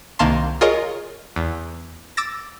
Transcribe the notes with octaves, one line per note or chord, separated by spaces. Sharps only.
C2 D#3 A#3 F5 A5 C6
F4 G#4 A#4 C#5 D#5
E2
D6 E6 A6 A#6